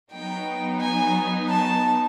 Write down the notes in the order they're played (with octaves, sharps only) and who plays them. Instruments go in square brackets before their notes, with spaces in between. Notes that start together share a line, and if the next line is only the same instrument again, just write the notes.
[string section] F#3 B3 D#4 [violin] G5
[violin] G#5
A5